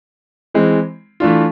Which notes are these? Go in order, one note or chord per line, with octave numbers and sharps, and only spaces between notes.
E3 G#3 C4
E3 A3 D4 F4